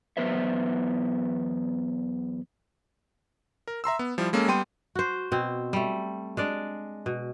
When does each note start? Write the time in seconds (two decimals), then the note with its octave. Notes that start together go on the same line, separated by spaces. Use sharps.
0.17 E2 F#3 B3 B4 C5 E5
3.68 A#4
3.84 E5 A#5 C6 E6
3.99 B3
4.18 F3 G3 E4
4.33 G#3 A#3 C#4 A4
4.48 G3 B3 G5 C6 D#7
4.95 F#4 C5
5.32 B2 C4
5.73 G3 A3
6.37 G#3 D4 D5
7.06 B2